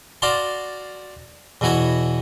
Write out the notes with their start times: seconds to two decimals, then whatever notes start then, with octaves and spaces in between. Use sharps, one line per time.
0.22 F#4 D5 F5 A5 C6
1.61 E2 B2 E3 F#4 C#5 C#6